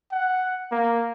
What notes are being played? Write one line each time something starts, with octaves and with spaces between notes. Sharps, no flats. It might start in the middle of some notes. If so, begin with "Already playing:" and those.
F#5
A#3